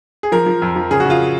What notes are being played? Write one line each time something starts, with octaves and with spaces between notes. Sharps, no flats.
G#4
F3 A#4
F3
F2
F3
C#3 G#4
F#4
C#3 F4